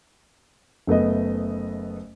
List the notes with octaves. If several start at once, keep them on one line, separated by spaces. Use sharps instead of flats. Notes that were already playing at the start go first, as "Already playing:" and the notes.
F#1 A3 B3 D#5